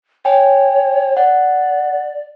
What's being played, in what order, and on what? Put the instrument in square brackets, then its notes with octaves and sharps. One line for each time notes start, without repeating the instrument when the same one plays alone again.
[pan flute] C#5 [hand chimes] G5 G#5
[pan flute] D5 [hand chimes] F#5